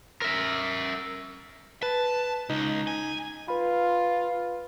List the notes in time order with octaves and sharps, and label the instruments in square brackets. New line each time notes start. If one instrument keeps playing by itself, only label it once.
[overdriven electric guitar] A#4 E5
[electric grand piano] B4 [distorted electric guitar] A5
[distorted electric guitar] C#2 [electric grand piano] D#4
[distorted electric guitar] G#5
[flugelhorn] F4 [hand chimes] B4 B5